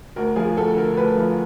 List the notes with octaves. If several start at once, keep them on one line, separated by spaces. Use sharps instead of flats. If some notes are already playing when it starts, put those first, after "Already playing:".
D2 A#4
F3 G#4
D2 A4
D3 A#4
D2 B4
F3